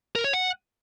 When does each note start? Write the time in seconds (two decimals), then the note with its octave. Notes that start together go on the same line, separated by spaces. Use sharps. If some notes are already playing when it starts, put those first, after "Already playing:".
0.15 A#4
0.24 C#5
0.33 F#5